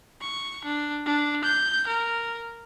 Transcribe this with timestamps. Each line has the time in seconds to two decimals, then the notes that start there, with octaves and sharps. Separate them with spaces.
0.21 C#6
0.65 D4
1.06 D4
1.44 G6
1.88 A#4